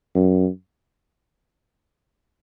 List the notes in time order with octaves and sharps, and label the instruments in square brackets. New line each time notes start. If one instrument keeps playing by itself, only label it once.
[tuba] F#2